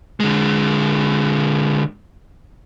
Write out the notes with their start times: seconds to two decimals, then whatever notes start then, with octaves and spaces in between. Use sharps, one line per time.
0.20 D3 G#3